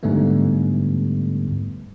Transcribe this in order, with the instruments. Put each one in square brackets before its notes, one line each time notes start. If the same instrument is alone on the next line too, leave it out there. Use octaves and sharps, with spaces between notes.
[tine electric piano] G#2 D3 G3 A3 B3